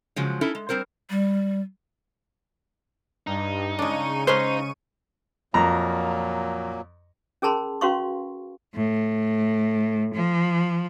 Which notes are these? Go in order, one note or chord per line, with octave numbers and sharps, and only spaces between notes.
C#3 F3 F#3 G#3
C#4 D#4 E4 A4
G#3
G3 C4 A#4 C5
G3
G2 D#4
C#3 G#3 D4 C#6 D#7
G#3 C#4 D#4 B4 C5
F2 A#2 F#3 A#3 A#5
C#4 G#4 A#4 A5 B5 C6
C#4 F#4 B4 F5 C6 C#6
A2
F3